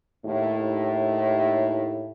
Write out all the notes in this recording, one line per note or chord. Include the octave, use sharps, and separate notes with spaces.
D#2 A2